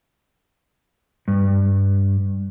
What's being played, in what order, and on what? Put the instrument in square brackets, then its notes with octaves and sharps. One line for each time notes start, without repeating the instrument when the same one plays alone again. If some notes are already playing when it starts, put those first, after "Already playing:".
[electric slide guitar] G2